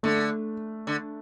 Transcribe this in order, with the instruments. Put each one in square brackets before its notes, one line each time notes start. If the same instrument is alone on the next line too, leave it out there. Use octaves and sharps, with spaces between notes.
[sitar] D3 [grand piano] A3
[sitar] D3